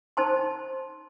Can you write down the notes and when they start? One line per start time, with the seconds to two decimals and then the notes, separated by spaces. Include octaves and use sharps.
0.17 D#4 C5 A5 C6